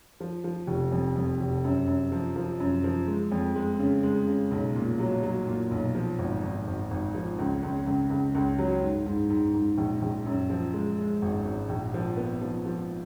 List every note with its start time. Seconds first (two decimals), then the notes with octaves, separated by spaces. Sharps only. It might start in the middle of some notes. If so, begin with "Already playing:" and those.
0.20 F3
0.44 F3
0.67 F1
0.92 F2
1.16 F2
1.40 F1
1.64 F#2
1.87 F#2
2.12 F3
2.36 F3
2.60 F#2
2.84 F3
3.07 G#3
3.32 F2
3.55 G#3
3.79 C#3
4.03 G#3
4.27 C#3
4.51 B1
4.75 A#2
4.99 F#3
5.23 F#3
5.47 A#2
5.71 B1
5.95 F3
6.19 G#1
6.43 G#1
6.67 G#1
6.91 G#1
7.15 F3
7.39 C#2
7.63 C#2
7.86 C#2
8.10 C#2
8.35 C#2
8.58 F#3
8.82 G#2
9.06 G#2
9.30 G#2
9.54 G#2
9.78 A#1
10.02 A#1
10.26 F#2
10.50 F3
10.74 G#3
10.98 G#3
11.22 G#1
11.45 G#1
11.69 A#1
11.94 F3
12.17 B3
12.42 F3
12.66 F3